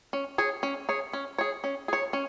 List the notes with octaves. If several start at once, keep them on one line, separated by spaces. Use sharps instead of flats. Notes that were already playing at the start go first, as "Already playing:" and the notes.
C#4
G#4 C#5
C#4
G#4 C#5
C#4
G#4 C#5
C#4
G#4 C#5
C#4